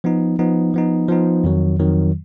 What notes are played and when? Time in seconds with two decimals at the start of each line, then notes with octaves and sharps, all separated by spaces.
0.04 F3 B3 D#4
0.39 F3 B3 D#4
0.74 F3 B3 D#4
1.08 F3 B3 D#4
1.44 F2 D#3 F#3
1.79 F2 D#3 F#3